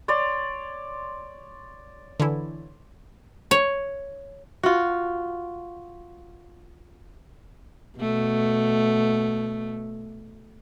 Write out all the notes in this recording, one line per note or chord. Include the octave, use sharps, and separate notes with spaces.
C#5 D5 C6
D3 E3 E4
C#5
F4 F#4
B2 A3